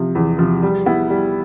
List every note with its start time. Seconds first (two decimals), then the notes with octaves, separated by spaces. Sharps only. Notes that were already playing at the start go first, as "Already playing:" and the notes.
Already playing: C3 F3
0.15 E2
0.39 C3 F3
0.63 G3
0.86 B3 E4
1.10 G3